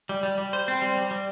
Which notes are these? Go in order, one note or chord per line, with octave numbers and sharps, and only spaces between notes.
G3
G3
G3
C5
C4
G3
G3
G3